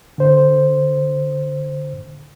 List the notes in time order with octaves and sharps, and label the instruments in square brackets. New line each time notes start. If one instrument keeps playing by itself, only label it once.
[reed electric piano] D3 C5